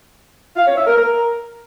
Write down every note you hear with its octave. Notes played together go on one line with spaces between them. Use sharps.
F5
C#5
E5
A#4
A#4